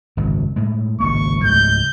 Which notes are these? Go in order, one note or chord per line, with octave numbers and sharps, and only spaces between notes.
G#1 C#2 F#2
A2 G#3
G#1 C#2 A#3 C#6
C#2 G#2 A3 G6